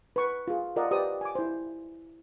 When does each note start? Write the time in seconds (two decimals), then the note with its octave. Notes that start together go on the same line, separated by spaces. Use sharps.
0.16 B4 C#6
0.48 F4 G#4
0.76 F4 A#4 D5 D#5 F#5
0.91 G4 B4 C5 D5 D#6
1.21 G#5 D6
1.35 E4 C5